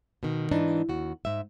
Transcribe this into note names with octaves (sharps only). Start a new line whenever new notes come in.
B2 D#3
G#2 E3 D4 D#4
D#2 F#4
G#2 E5